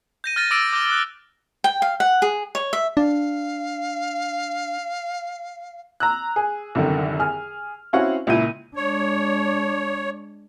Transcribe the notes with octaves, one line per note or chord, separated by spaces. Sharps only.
G6 A#6 D#7
F6 G6 A6 A#6 D#7
D6 E6 A6 A#6 D7 E7
D6 G6 A#6 D#7 G7
D#6 F#6
G5
F5
F#5
G#4
C#5
E5
D4 F5
A#5 E6 F#6
G#4
C2 F#2 D3 D#3
G#4 F6
C4 C#4 E4 F#4 F5 F#5
C#2 A#2 E4 G6 D#7
G#3 D4 C#5